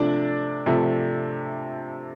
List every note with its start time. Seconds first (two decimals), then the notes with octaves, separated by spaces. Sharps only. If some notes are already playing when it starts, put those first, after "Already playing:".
Already playing: C3 F3 A3 D4 D5
0.66 C3 F3 A3